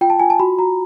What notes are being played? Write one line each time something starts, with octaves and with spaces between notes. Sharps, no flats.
F4 G5
A5
F4 G#5
A5
F#4 B5
F#4 A#5